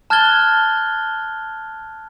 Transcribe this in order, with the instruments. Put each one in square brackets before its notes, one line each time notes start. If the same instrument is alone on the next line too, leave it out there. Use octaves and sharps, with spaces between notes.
[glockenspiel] A5 F6 F#6 G#6 A6 G7